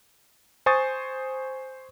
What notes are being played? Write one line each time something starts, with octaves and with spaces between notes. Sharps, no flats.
C5 G#5 C#6 D#6 A6